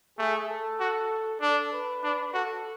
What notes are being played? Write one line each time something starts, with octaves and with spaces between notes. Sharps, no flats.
A3 G#4
A4
F#4
D4 A4
B4
D4
F#4 A4